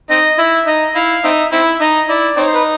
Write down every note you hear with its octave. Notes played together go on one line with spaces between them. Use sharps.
C4 D#4 D#5
E4 E5
D#4 D#5
E4 F5
C4 D#4 E5
C4 E4 E5
D#4 D#5
E4 D5
C4 D#4 C#5
C5
B4